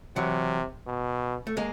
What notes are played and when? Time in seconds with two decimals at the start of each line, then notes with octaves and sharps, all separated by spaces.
0.16 C3 E3 F#3
0.86 B2
1.47 A3
1.57 G#3 A#3